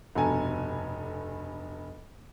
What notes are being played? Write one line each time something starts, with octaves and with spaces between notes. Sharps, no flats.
F1 G2 B2 A4 G#5 A#5